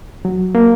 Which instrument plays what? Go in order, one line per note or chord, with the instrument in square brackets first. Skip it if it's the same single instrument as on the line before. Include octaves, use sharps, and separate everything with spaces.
[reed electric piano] F#3
A#3